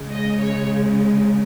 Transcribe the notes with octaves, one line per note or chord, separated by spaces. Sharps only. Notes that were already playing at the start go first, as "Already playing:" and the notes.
Already playing: C#3 G#3
D#5
C#5